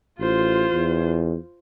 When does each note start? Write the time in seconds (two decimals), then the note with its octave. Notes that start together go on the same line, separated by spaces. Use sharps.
0.19 A1 F4 C5
0.72 E2